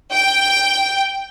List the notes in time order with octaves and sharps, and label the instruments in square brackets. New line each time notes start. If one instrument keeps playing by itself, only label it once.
[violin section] G5